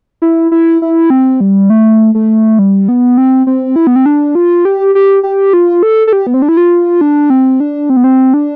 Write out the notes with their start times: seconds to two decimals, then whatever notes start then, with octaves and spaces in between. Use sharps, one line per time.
0.22 E4
0.52 E4
0.82 E4
1.10 C4
1.41 G3
1.70 A3
2.15 A3
2.59 G3
2.88 B3
3.18 C4
3.47 C4
3.76 E4
3.87 B3
3.96 C4
4.06 D4
4.35 F4
4.65 G4
4.95 G4
5.23 G4
5.53 F4
5.83 A4
6.07 A4
6.13 G4
6.27 B3
6.34 C4
6.42 D4
6.49 E4
6.57 F4
7.01 D4
7.30 C4
7.60 D4
7.90 C4
7.97 B3
8.04 C4
8.34 D4